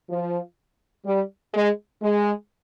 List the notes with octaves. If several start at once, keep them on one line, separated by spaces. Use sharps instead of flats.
F3
G3
G#3
G#3